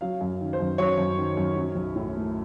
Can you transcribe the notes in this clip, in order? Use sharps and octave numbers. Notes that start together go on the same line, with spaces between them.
F#3 F5
F#2
D#3
C5
F#2
F#3 C#5
F#2
D#3
F#2
F#3
B1
A2
A3